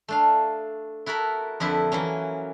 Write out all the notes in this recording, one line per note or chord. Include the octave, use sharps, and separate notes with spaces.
A3 D4 F5
E4 F#4 A4 A#4 B5
F2 D3 E4 G4 B4
E3 F#3 A#3 C#4